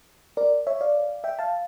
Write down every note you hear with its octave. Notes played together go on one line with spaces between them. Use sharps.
A#4 D5
C#5 E5
D5 F5
E5 G5
F5 A5